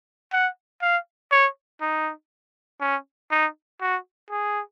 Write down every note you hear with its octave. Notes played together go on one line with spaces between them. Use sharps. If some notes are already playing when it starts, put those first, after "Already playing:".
F#5
F5
C#5
D#4
C#4
D#4
F#4
G#4